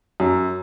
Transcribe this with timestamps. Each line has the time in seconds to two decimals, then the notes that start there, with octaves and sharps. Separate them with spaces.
0.20 F#2